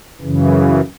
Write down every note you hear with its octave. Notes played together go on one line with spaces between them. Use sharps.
F#2 C#3 E3